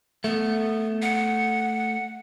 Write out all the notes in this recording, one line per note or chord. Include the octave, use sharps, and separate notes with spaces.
A3 B3
F#5